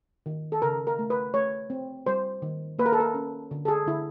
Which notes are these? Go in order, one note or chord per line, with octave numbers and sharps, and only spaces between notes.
D#3
A4
C#3 A#4
A#4
A3
B4
A3 C#5
C4
G3 C5
D#3
A#3 B4
A#4
A4
A#4
C#4
D3
A4
G#4
D3 E4